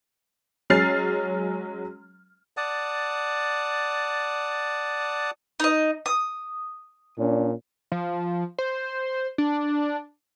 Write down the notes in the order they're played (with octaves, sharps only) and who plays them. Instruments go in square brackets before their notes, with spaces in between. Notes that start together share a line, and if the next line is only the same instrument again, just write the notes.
[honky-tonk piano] F#3 G#3 C#4 F6 A6 C7
[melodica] D5 F#5 A5 D#6
[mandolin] D#4 D#5
D#6
[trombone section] A#2 C#4 D4
[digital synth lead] F3
C5
D4